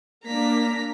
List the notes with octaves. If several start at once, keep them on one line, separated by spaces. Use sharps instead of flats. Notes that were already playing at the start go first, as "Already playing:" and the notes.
A#3 D4 A#5 B6